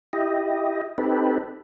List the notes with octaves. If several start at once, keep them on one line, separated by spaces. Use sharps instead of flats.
E4 G4 D#5
C4 D#4 G4 A4 B4